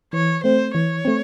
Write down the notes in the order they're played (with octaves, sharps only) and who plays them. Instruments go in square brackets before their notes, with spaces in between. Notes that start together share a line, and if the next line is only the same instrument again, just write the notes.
[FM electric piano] E3 [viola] C#5
[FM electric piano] A3 C4 [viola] C5
[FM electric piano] E3 [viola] C#5
[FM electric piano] A3 C4